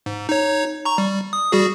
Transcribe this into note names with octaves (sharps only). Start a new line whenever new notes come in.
G#2
D#4 C#5
A#5 C#6
G3
D#6
G3 F#4 G#4